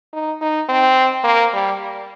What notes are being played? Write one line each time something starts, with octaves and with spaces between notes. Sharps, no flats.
D#4
D#4
C4
A#3
G3